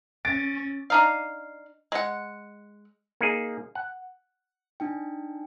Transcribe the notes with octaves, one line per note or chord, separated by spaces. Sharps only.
C#4 A6 D7
D4 D#4 F5
G#3 F#5
A#3 D#4 G#4
F#5
D4 D#4 G5